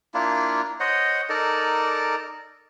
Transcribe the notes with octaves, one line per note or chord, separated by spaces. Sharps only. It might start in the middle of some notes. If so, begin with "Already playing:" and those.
A#3 D4 E4 F4
C5 C#5 D#5 F#5
D#4 A4 A#4 D5